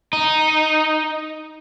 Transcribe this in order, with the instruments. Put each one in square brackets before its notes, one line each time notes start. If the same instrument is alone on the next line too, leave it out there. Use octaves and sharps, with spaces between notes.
[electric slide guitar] D#4